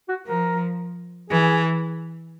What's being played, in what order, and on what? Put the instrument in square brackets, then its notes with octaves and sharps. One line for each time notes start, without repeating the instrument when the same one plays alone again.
[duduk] F#4
[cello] F3 [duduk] A#4
[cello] E3 [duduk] G#4